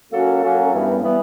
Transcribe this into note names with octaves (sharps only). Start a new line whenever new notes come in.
F#3 A#3 C#4 F#4 A4
F#3 A#3 C#4 F#4 A4
G2 E3 G3 B3
E3 G3 B3